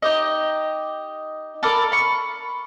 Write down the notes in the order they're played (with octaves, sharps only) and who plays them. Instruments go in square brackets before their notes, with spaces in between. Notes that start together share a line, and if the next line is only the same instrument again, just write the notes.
[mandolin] D#4 G4 D#5
A4 A#4 D5 B5
B5 C#6